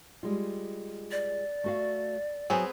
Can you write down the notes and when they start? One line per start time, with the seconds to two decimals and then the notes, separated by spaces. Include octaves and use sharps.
0.23 G3 G#3 F4
1.11 D5
1.64 A3 F#4 F5
2.50 F#3 B3 C4 F#4 G#4 G#5